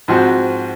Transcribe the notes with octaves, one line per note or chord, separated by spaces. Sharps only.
G#2 F3 C4 F#4